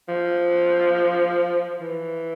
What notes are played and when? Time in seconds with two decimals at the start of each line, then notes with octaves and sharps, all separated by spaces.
0.08 F3
1.80 E3